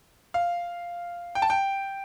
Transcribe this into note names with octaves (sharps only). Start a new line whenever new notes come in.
F5
G5
A5
G5